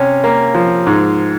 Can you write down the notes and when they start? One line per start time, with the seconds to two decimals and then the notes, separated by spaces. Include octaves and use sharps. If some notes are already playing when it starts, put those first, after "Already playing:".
Already playing: C3 C#4
0.24 A#3
0.54 F3
0.87 G#2